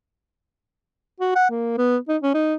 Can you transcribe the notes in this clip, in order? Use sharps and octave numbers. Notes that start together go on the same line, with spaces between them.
F#4
F#5
A#3
B3
D#4
C#4
D#4